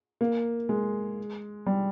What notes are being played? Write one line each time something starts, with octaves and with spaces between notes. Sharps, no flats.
A#3
G#3
G3